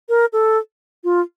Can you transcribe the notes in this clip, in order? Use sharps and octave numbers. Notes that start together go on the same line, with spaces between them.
A#4
A4
F4